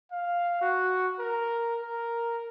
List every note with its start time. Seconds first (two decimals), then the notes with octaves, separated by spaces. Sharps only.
0.12 F5
0.62 F#4
1.19 A#4
1.82 A#4